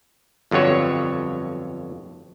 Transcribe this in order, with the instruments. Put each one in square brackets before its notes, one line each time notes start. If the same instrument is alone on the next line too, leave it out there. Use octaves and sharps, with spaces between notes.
[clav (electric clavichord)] G1 F2 D3 F#3 C#5